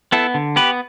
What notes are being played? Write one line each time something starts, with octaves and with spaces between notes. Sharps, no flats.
B3 E4 A4
D3
B3 G4 B4